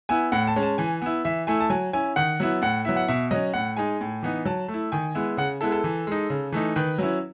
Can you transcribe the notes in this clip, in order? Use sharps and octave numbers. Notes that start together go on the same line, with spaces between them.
B3 E4 G#5
A2 F#5
A5
G#3 C#4
A5
E3 G#5
B3 E4
E3 E5
A3 E4 G#5
A5
F#3 G#5
C#4 E4 G#5
D#3 F#5
F#3 B3 E4
A2 F#5
F#3 B3 E4 E5
F#5
B2 E5
F#3 C#4 D#5
A2 F#5
G#3 D#4 G#5
A2
E3 B3 D#4
F#3 A5
A3
E4
D#3 G#5
G#3 B3 E4
C#3 F#5
G#3 B3 E4 A4
A4
E3
G#3 D#4
C#3
E3 A3 D#4
D#3 B4
F#3 C#4 E4